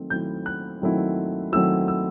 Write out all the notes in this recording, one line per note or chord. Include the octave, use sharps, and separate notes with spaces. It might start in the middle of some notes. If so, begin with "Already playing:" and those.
Already playing: D#3 F#3 A3 C4
D#3 F#3 A3 C4 E4 G6
F#6
D#3 F#3 A3 C4 E4
D#3 F#3 A3 C4 E4 E6
E6